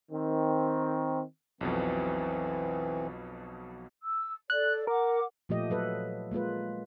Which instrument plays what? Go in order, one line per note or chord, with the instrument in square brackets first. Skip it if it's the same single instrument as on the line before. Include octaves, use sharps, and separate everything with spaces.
[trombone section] D#3 C4
[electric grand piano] B1 F2 B2 [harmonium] E3 C4
[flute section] E6
[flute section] A4 D5 [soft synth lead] F#6
[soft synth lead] A#4 [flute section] F#5 D6
[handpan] A#2 F3 A3 G4 D#5
F#3 A4 B4
G#3 A#3 F4 B4